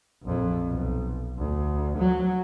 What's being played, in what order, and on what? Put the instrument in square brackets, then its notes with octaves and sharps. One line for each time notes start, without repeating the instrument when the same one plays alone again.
[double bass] A#1 F2
B1
D2
F#3